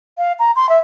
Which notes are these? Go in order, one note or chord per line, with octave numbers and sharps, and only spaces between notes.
F5
A#5
C6
E5